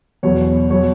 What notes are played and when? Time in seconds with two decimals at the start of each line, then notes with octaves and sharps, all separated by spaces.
0.23 E2 B2 F#3 C#5
0.70 B2 F#3 C#5